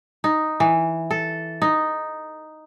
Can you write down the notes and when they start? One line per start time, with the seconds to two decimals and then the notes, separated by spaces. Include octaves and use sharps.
0.24 D#4
0.60 E3
1.11 A4
1.62 D#4